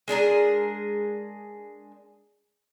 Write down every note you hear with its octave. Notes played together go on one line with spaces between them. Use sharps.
G#3 D4 G#4 A#4